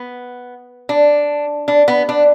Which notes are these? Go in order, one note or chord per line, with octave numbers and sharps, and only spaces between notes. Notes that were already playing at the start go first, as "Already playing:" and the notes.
Already playing: B3
D4
D4
B3
D4